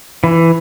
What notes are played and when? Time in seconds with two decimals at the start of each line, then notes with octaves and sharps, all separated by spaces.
0.24 E3